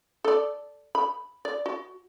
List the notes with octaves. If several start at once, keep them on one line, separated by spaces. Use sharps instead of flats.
A4 D5
B5
D5
F#4